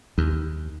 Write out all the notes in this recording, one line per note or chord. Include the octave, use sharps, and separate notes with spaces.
D#2